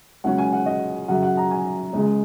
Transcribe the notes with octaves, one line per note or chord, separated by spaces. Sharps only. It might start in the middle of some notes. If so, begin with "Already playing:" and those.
C#2 C#3 F#3 C#4 F#5
G#5
F#5
D#5
F#2 C#3 F#3 F#5
F#5
A#5
G#5
C#2 C#3 G#3